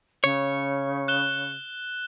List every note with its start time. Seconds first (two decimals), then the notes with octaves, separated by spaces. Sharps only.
0.24 C#3 C#5
1.08 F#6 E7 G7